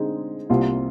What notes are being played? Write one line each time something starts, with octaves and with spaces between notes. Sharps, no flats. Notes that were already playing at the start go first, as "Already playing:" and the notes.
Already playing: D3 G#3 C4 D#4 G#4
C2 C3 G3 A#3 F4